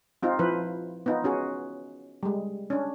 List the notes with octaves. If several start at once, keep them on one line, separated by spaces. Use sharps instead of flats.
C4 D#4 F4
F3 E4 B4 C5
B3 D#4 F4
C#4 F#4 G#4
G3 G#3
C#4 D4